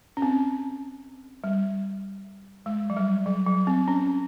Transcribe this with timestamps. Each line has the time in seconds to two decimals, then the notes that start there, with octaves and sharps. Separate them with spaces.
0.17 C#4
0.22 C4
1.44 G3
2.66 G#3
2.90 F#3
2.97 G3
3.26 F#3
3.47 F#3
3.67 C4
3.88 C#4